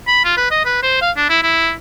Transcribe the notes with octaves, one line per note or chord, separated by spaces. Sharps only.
B5
F4
B4
D#5
B4
C5
F5
D4
E4
E4